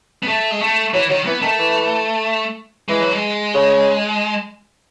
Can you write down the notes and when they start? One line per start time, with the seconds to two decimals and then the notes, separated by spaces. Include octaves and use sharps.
0.23 B3
0.28 A3
0.51 G#3
0.61 A3
0.93 E3 F#3
1.09 D#3 F#3
1.26 E3 B3
1.42 D#3 A3
1.58 E3
2.89 E3 G#3
3.01 F#3
3.13 G#3
3.54 C#3